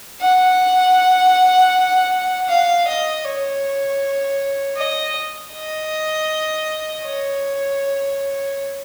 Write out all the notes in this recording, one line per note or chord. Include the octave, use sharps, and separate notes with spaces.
F#5
F5
D#5
C#5
D#5
D#5
C#5